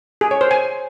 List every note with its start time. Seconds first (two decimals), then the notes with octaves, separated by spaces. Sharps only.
0.21 G#4
0.31 C#5
0.41 C5
0.51 G#5